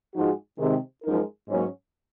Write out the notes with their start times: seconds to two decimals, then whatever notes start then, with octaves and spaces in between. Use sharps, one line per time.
0.14 G#2 F3 G#3 D#4 F#4
0.59 C3 D#3 G#3
1.04 F#2 F3 G#3 D#4 A#4
1.48 G#2 F#3 A#3 C#4